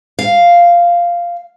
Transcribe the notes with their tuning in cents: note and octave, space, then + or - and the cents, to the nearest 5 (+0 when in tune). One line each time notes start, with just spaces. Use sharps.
F5 -5